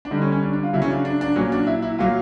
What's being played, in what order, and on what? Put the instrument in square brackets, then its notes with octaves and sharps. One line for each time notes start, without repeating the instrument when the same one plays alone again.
[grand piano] D4
D3 G3 D#4
C#4
C#4
D4
D4
F4
C#3 F#3 E4
C#4
D4
D4
D4
A#2 F#3 C#4
D4
E4
E4
A#2 F#3 F4